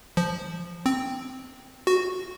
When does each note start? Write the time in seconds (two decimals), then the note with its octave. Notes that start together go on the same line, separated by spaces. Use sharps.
0.17 F3
0.86 C4
1.87 F#4